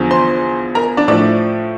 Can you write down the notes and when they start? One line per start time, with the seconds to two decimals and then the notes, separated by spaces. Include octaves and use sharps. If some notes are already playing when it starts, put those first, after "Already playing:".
Already playing: E2 D3 F3
0.11 C5 C6
0.75 A#4 A#5
0.97 D4 D5
1.08 A2 F3 A3 D4 D5